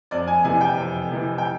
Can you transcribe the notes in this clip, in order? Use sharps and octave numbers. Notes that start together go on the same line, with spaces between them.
F2 D5
G#5
C3 E3 G#5
G5
F2
C3 E3
G5